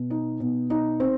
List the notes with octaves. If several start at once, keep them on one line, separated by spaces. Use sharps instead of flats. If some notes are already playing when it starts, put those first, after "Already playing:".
Already playing: B2
D#4
B2
D#4
C4